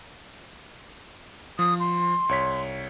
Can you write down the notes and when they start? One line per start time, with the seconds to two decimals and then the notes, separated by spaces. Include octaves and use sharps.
1.59 F3 D#6
1.80 C6
2.29 C2 C#5 B6